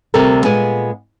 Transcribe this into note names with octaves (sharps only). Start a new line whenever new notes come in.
D2 C3 G3 A4 A#4
A#2 G#3 B3 G#5